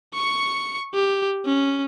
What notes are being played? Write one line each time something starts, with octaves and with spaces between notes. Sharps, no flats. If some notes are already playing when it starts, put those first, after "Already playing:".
C#6 C#7
G4
C#4